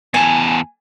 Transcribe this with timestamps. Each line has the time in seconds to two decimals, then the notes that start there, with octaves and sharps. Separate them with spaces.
0.14 E2 G#5 A5